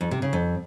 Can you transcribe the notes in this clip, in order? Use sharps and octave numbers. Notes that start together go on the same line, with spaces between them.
F2
C3
C#3
F2